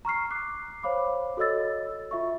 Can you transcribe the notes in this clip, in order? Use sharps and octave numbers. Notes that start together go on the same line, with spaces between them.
A#5 C#6 F6 C7
D6 F#6 C7
C5 C#5 F5 B5 D6
F#4 A4 C#5 D#5 E6 A6
F4 E5 C#6